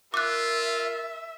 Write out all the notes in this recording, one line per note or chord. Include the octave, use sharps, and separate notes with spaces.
F4 A#4 E5 D6 F#6